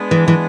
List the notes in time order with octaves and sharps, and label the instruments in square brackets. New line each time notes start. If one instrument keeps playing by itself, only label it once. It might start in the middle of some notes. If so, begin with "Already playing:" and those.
Already playing: [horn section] G#3 B3 D4
[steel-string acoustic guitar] E3
E3